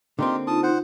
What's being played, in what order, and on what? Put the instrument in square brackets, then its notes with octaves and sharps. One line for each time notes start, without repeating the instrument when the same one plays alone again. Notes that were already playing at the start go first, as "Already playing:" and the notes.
[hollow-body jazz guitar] D3 A#3 C4 [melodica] D#4 F4 G4
[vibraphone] D#4 F4 [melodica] A5 D#6
[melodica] C5 F#5